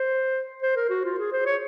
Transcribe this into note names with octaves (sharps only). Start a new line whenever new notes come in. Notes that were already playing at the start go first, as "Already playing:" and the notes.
Already playing: C5
C5
A#4
F#4
F4
G#4
C5
C#5